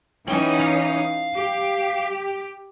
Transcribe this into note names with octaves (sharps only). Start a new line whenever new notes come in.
E3 C#4 D#4 G5 G#5
F5
G4